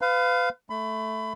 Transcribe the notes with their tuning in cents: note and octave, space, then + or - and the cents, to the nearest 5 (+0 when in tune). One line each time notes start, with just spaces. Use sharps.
B4 +35 F5 +0
A3 +0 B5 +25